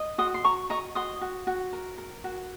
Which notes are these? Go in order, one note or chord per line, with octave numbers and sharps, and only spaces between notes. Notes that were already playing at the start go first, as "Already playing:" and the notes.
Already playing: D#5
F#4 C6 D#6
C6
F#4 A#5 C#6
D#5 A#5 C#6
F#4 C6 D#6
F#4
F#4
A#4
A#4
F#4